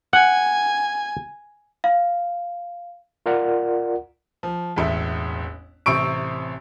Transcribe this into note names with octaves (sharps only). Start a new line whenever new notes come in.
F#5 G#5
F5
F4 A#4 D5 F#5
F3
E1 A1 E5
A1 C3 C4 C#6 D7